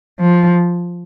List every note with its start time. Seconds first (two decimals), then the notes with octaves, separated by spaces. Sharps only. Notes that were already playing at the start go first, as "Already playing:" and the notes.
0.19 F3